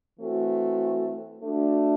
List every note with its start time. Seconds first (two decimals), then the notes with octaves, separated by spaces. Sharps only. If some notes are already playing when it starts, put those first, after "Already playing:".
0.19 E3 A3 C4 F#4
1.41 A3 D4 F#4